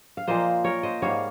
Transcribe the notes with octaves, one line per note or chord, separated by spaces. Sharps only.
F5
A#2 F3 A#3 C5 D#5
A#4 C#5
C5 D#5
G#2 G3 A#3 C#5 F5